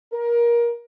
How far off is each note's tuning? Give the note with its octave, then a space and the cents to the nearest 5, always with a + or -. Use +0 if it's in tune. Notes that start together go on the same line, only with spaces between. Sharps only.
A#4 +20